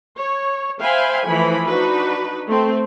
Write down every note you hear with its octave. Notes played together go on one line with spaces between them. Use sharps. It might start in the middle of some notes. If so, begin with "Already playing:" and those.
C#5
C5 E5 F5 G5 G#5 B5
E3 F3 A3 E4 B5
D4 D#4 F#4 B4
A3 C4